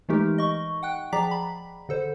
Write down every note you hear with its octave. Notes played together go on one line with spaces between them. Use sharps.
E3 G#3 A3 D#4 G4 A#4
D#5 C#6
F#5 G5 F#6
F3 G#4 D5 A#5 D6 B6
B5
D3 A4 C5